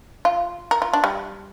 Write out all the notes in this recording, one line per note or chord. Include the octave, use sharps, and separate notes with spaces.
F4
A#4
F4
D4
G3